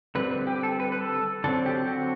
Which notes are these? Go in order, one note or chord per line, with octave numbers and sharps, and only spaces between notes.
D3 G3 C4 B4
B4
G4
A4
B4
B4
A4
D3 F#3 C4 A4
G4
F#4